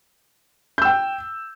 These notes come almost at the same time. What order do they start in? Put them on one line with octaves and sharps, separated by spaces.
G6 E6 G5